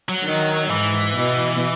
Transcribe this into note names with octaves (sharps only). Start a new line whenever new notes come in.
F#3
D#3
G#2 E3
B2